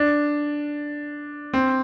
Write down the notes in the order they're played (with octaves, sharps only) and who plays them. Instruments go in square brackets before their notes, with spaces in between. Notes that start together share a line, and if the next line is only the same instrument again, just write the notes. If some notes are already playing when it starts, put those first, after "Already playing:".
Already playing: [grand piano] D4
C4